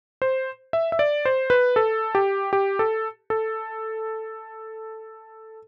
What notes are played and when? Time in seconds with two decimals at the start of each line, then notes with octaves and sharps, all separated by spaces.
0.22 C5
0.73 E5
0.92 E5
0.99 D5
1.25 C5
1.50 B4
1.76 A4
2.15 G4
2.53 G4
2.79 A4
3.30 A4